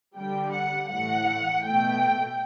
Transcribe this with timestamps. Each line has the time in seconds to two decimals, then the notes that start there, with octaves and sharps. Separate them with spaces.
0.16 D3 G3 G5
0.53 F#5
0.90 A2 E3 A3 F#5
1.63 B2 A3 G5